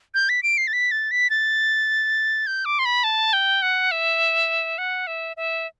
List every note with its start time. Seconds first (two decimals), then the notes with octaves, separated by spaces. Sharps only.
0.14 G6
0.29 B6
0.43 D7
0.58 C7
0.67 A6
0.73 B6
0.91 A6
1.11 B6
1.30 A6
2.47 G6
2.65 D6
2.79 C6
2.85 B5
3.04 A5
3.33 G5
3.62 F#5
3.91 E5
4.78 F#5
5.07 E5
5.37 E5